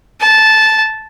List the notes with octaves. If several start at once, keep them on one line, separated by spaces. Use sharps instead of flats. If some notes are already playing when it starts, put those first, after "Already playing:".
A5